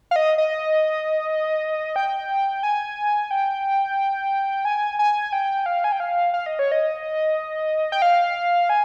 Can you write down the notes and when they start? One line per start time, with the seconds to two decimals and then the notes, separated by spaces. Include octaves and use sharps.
0.11 F5
0.16 D#5
0.38 D#5
1.96 G5
2.63 G#5
3.31 G5
4.65 G#5
4.99 G#5
5.33 G5
5.66 F5
5.84 G#5
5.92 G5
6.00 F5
6.34 F5
6.46 D#5
6.59 C#5
6.72 D#5
7.92 G5
8.02 F5
8.70 G#5